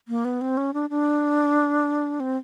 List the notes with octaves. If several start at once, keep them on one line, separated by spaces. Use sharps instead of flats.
A#3
B3
C4
C#4
D4
D4
C4